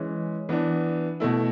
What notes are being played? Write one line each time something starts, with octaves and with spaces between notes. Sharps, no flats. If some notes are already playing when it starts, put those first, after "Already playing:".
Already playing: E3 G#3 C#4
E3 B3 D4
B2 A3 E4